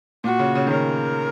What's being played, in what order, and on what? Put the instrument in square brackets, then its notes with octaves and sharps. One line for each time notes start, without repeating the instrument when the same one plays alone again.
[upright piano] A#2 [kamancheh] F#4
[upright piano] C#3
C#3
D#3
[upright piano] C#3 [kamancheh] A#4